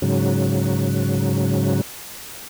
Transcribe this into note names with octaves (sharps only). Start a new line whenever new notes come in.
G#2 C#3 F#3